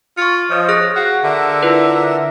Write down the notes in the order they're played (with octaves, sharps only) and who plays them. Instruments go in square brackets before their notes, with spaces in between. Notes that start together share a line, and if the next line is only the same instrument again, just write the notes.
[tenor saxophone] F4 [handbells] C#6 C#7
[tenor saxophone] F3 [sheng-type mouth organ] C#5 D#5
[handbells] G#4 F#6 A#6
[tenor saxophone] F#4 [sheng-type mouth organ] F5
[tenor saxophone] D3 [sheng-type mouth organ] A#4 E5
[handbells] E4 F4 B4